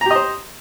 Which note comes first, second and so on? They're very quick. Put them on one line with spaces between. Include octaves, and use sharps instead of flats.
A#5 G4 D#5 C5